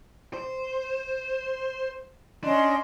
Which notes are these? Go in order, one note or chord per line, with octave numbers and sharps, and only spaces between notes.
C5
C#4 D4 D#5 C6